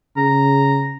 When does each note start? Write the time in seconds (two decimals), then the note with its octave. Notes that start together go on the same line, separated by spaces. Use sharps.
0.16 C#3 A#5